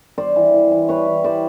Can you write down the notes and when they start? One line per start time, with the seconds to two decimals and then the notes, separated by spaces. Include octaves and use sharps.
0.18 G3 C5 D5
0.36 E3
0.54 E3
0.71 E3
0.89 G3 B4 C#5
1.07 E3
1.24 G3 C5 D5